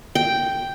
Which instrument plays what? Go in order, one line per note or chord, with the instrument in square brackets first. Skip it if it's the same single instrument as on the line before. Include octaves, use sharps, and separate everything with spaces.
[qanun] G5